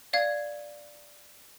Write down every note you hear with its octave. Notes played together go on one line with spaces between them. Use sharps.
D5 F5 G#6